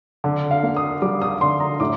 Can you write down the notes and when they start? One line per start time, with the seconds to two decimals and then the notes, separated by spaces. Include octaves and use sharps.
0.24 D3
0.51 F5
0.63 A#3
0.76 D#6
1.02 G3 D6
1.22 D#6
1.41 D3 C6
1.60 A#5
1.80 A2 D6